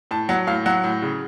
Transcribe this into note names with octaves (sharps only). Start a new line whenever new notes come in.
A2 A5
F#3 F#5
A2 F5
F#3 F#5
A2
C#3